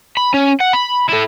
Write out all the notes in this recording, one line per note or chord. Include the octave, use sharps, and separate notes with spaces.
B5
C#4
F#5
B5
E4 A4